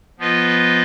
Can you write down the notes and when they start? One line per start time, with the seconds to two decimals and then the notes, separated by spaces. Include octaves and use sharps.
0.19 F3 B3 F4 B4 D#5